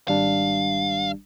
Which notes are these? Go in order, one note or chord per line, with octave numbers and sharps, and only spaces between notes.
G#1 G3 D4 F5